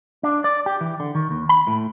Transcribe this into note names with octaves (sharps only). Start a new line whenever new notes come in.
D4
D5
G4
E3
D3
D#3
D#2
B5
A2